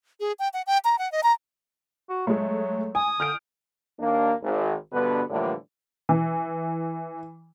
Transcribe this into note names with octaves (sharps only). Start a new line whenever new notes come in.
G#4
G5
F#5
G5
A#5
F#5
D#5
A#5
F#4
F#3 G#3 A3
G#5 D#6
D3 F6 G6 D7
D#2 A#3 D4
G#1
G2 B2 D3 B3 B4
A2 D3 E3 F3 G3 A#3
E3